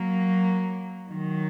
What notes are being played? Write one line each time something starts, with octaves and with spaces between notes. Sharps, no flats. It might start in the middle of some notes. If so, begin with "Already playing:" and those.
Already playing: F#3 A#3
D#3 F#3